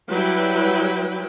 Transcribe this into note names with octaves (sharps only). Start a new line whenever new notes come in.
F#3 G3 E4 B4 G5